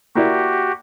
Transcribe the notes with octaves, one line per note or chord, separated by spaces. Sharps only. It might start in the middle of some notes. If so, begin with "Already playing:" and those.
A#3 E4 F#4 G4 D5